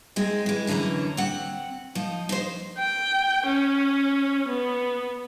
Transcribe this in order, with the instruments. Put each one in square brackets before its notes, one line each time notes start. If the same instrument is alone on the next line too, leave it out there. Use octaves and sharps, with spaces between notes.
[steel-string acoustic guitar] G#3 C4 D#4
E3 G#3
F#2 D3 E3 C#4 A#5
C4 F#5
F3 D#4
D#4 C5
[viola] G5
C#4
B3